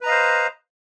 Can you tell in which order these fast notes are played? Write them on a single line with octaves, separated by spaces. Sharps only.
B4 A#5 D#5 F5 C5